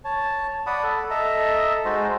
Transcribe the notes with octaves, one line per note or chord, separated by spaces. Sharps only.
C#5 A5
D5 F#5 B5 D#6
A4
A4 D#5 E5 A#5
G#3 D#4 F#4 C5